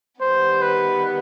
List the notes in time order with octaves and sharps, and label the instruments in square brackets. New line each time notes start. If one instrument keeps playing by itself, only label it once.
[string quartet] D#3 G3 B3 [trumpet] C5
[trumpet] B4